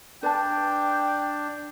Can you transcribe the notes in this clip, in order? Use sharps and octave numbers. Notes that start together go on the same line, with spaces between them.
D4 B4 G5 A5